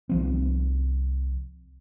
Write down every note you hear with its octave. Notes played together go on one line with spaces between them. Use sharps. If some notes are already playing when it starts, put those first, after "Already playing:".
C2 F3 C4